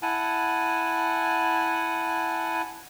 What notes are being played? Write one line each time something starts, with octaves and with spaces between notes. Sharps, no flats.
E4 F#5 G#5 A5